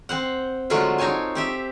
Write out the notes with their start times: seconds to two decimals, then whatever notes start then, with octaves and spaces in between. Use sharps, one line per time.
0.09 C4 C5 F#5
0.70 D3 F#3 G#3 A3 D4 F4
0.98 C4 D#4 C#5 G#5 A5
1.35 C4 G4 E5